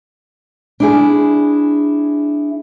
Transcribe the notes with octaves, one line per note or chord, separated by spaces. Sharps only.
D4 E4 G#4